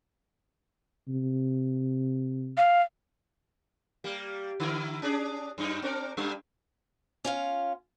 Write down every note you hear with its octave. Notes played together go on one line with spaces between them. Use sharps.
C3
F5
G3 A#3
D3 E4 A#4
C#4 D4 G#4
F#2 D#4
C4 D4 A#4
G2 G3 D4
C#4 F4 F5